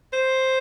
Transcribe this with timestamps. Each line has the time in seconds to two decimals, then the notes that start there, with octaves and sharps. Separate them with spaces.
0.13 C5